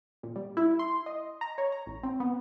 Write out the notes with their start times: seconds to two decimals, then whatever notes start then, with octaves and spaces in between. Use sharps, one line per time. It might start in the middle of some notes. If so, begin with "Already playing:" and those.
0.23 A#2
0.36 G3
0.57 E4
0.79 C6
1.06 D#5
1.41 A#5
1.58 C#5
1.72 A#5
1.86 A1
2.03 C4
2.20 B3